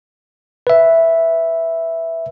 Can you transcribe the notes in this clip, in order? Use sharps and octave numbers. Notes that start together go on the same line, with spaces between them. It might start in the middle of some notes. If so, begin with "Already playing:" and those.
B4 E5